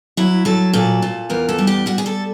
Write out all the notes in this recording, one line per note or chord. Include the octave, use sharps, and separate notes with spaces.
F#3 E4
F#3 A4
A#2 A4
A#2
E2 A#4
A4
G3
G4
G3 F#4
G#4
A4